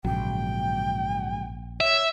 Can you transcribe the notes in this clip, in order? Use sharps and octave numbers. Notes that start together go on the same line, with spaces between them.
A#1 G#2 C#3 F#3 G5
C#5 E5